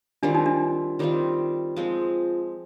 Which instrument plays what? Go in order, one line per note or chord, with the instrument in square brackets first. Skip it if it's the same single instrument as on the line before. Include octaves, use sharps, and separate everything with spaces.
[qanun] D#3 G3 C4 F4 [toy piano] D4
[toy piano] D#4
D4
[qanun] D#3 G3 C4 F4
F3 G#3 C4